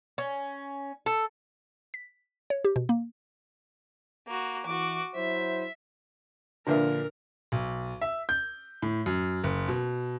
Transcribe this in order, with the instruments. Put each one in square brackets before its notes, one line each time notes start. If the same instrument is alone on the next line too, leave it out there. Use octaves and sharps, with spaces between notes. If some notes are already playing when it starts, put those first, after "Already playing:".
[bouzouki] C#4
A4
[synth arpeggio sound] B6
C#5
G4
B2
A#3
[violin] A#3 F#4
[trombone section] E3 [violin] F#4 D6
[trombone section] F#3 E4 C5 [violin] E5
[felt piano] A#2 D3 F3 [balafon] D4 B4 E5 [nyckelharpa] A#4
[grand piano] B1
E5
G6
A2
F#2
F#1
B2